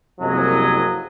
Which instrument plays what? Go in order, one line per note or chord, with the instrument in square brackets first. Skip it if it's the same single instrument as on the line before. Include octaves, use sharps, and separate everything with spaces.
[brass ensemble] F#1 C2 F2 F#3 D#5 G#5